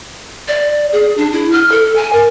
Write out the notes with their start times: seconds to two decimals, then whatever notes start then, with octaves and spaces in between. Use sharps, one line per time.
0.48 D5
0.92 G#4
1.17 D4
1.33 E4
1.52 F6
1.72 A4
1.96 G#5
2.13 A#4